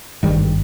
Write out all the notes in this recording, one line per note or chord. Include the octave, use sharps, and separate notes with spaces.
G#1 G2 D#3 G3